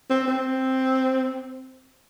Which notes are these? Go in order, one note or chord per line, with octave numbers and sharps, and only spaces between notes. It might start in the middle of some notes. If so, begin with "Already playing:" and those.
C4
C4